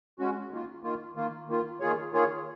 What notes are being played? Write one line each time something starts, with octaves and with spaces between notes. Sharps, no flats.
G#3 C#4 F#4
D#3 A#3 F4
D#3 A#3 F4
D#3 A#3 F4
D#3 A#3 F4
D#3 A#3 F4 G#4 C#5
D#3 A#3 F4 G#4 C#5